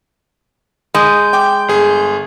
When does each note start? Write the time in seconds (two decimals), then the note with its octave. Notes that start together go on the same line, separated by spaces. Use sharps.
0.94 G#3 D#5 G6
1.33 G5 D6
1.68 G1 G#4